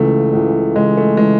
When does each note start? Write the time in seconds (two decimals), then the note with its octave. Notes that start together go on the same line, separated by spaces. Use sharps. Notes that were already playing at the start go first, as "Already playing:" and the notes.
Already playing: C#2 C#3 E3 A3
0.33 C#2 C#3 E3
0.76 C#2 C#3 E3 G#3
0.97 A3
1.17 C#3 E3 G#3